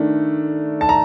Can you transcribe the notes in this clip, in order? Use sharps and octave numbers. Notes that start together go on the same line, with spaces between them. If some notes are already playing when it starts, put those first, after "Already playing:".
Already playing: D#3 A3 D4
A5
A#5